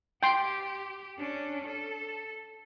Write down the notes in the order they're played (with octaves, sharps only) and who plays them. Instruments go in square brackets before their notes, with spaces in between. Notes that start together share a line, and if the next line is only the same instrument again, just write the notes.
[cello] G4 [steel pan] G5 C6
[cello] C#4 D4
A4